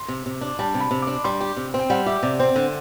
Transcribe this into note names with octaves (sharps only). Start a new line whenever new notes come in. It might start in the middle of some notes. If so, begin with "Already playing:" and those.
Already playing: C6
C3
C3
D4
G3 A5
C3
B5
C3
D4 D6
G3 C6
G4
C3
C4
G5
G3 F#5
G4 E5
C3 D5
C4 C5
D3